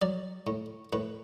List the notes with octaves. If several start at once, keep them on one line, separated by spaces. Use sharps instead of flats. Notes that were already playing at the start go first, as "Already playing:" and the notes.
F#3 D5
A2
A2 B4